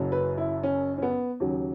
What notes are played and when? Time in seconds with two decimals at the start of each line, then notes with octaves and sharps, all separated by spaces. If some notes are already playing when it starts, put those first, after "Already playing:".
Already playing: F#1 F#2 C#3 F#3
0.12 B4
0.37 E4
0.63 C#4
0.98 C#4
1.02 B3
1.40 D#2 C#3 F#3